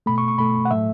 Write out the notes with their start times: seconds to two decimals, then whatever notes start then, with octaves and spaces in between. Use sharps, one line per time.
0.06 B2 A3 B5
0.18 C#6
0.28 C#6
0.38 B2 A3 B5
0.65 F#5
0.71 A2 F#3 A3 E5